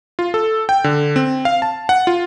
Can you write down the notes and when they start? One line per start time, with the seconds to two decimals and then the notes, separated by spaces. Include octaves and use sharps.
0.19 F4
0.34 A4
0.69 G5
0.84 D3
1.16 C4
1.45 F5
1.62 A5
1.89 F#5
2.07 F4